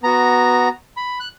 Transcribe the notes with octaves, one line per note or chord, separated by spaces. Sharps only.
B3 F#4 A#5
B5
F#6